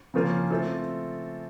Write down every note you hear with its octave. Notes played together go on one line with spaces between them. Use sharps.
C#3 F3 A#3 C#4 F4
A3 C4 F4 A4